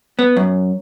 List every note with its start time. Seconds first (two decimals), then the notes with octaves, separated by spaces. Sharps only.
0.19 B3
0.37 F#2